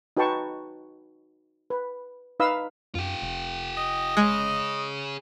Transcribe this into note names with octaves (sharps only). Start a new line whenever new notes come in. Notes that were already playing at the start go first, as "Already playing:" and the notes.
D#4 F#4 B4 G5 A5 C#6
B4
D#4 B4 F5 B5 D#6 E6
F#2 F4 G4
F1
D#5
G#3 G#4 C#5